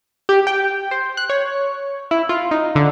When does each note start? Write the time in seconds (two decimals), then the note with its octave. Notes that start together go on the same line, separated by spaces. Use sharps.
0.29 G4
0.47 G5
0.91 C5
1.17 F#6
1.30 C#5
2.11 E4
2.29 F4
2.51 D#4
2.75 D3